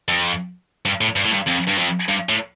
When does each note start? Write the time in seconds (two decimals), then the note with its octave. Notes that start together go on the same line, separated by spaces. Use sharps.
0.08 F2
0.85 G2
1.01 A2
1.16 G2
1.25 A2
1.32 G2
1.47 F2
1.67 G2
1.78 F2
2.08 G2
2.29 A2